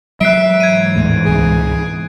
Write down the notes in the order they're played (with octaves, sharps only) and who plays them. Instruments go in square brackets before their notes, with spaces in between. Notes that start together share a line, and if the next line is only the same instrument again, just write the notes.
[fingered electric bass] F#3 G#3 [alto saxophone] E5 [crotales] F#6 C7 D7
[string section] G#2 E3 [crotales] G#6 D#7
[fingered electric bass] D#2 A2 A3
[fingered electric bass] C#2 B2 [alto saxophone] G#4